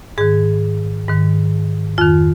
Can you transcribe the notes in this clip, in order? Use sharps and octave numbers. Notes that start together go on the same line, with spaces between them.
G#2 D#3 G#4
G#2 D#3
F2 D#3 F4